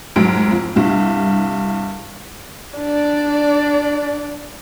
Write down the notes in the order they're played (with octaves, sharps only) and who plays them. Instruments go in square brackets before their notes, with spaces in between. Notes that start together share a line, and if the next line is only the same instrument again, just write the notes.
[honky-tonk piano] F1 G#2 F#3 D7
F2
C2 G2
[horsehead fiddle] D4 D5